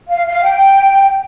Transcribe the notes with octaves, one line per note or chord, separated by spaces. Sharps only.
F5
F5
G5